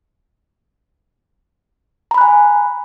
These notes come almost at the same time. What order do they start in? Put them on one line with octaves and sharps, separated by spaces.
A#5 B5 F#6 G#5